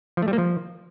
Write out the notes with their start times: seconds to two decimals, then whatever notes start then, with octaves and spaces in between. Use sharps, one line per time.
0.17 F3
0.22 A3
0.28 G3
0.33 A#3
0.38 F3